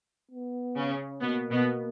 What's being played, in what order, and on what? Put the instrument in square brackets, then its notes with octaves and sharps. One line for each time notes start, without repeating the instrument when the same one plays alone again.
[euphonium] B3
[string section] C#3 C#4
[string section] B2 B3 [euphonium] A#3
[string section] B2 B3